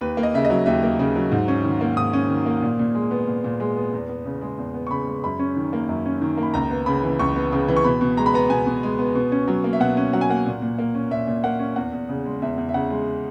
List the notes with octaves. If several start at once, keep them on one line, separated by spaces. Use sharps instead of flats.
D#2 B4
A#3
D#5
C#3 E5
D#5
F#3
D#2 E5
A#3
C#3
F#3
G#2
C#4
D#3
A#3
G#2 D#6
C#4
D#3
A#3
A#2
A#2
G#3
B3
A#2
A#2
G#3
B3
E2
B3
C#3
G#3
E2
B3
C#6
C#3 B5
G#3
F#2 B5
C#4
D#3
A#3
F#2
C#4
D#3
A#3
B5
C#2 A#5
B3
C#3 B5
E3
C#2 C#6
B3
C#3
E3
C#6
B2 B5
B2
G#3 A#5
B5
B3 A#5
B2 G#5
B2
G#3
B3
B2
C#4
F#3
A#3
E5
B2 F#5
C#4
F#3 F#5
G#5
A#3 F#5
A#2
A#2
A#3
C#4
A#2 E5
A#2
A#3 F#5
C#4
E2 F#5
E2
C#3
G#3
E2 E5
E2
E5
C#3 F#5
G#3